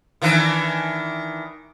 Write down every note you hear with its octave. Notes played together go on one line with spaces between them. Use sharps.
D#3 E3 D4